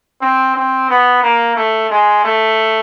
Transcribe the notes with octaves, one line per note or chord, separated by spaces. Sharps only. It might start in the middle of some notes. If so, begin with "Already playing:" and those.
C4
C4
B3
A#3
A3
G#3
A3